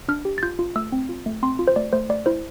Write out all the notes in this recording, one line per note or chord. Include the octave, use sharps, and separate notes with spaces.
D4 F6
G4
A6
F4 G6
F4
A3 E6
C4
F4
A3
C4 C6
F4
C5
A3 D5
A3 C5
A3 D5
E4 C5